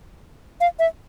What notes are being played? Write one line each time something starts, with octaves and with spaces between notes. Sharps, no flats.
F5
E5